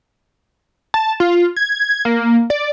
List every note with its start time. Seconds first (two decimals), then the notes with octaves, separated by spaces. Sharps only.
0.94 A5
1.20 F4
1.57 G#6
2.05 A#3
2.50 D5